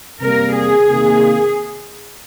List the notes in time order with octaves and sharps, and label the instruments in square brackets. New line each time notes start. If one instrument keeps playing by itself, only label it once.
[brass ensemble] C3 G3 A#3 [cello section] A#4
[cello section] G#4
[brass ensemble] C3 D#3 A#3